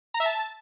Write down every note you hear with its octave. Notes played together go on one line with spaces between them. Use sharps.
A#5
E5
A5